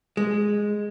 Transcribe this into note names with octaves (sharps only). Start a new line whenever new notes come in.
G#3